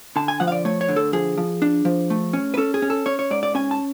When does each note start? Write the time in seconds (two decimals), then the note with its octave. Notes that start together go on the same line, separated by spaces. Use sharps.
0.16 D3 A5
0.28 G#5
0.40 F3 F#5
0.48 F5
0.52 D5
0.65 A3 C#5
0.81 C#5
0.88 D3
0.96 A4
1.13 F3 G#4
1.38 F3
1.62 D4
1.85 F3
2.10 A3
2.33 C#4
2.54 B4
2.58 C#4 A4
2.74 G#4
2.82 C#4
2.90 A4
3.06 C#4 C#5
3.19 C#5
3.31 G#2 D5
3.43 D5
3.55 C#4 G#5
3.71 A5